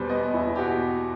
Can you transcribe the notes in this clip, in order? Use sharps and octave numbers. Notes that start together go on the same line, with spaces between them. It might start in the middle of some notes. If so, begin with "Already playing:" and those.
Already playing: E2 B2 G3 B4 C5
B3 D#5
E2 E4
G4
B2 F#4